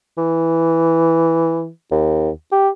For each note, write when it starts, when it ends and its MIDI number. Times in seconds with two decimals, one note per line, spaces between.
0.18 1.69 52
1.91 2.30 39
2.52 2.69 67